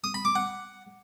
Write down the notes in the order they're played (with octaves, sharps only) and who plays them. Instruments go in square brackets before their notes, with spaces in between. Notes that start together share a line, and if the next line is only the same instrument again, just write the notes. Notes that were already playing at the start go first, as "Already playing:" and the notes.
[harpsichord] D#6
B5
D6
F#5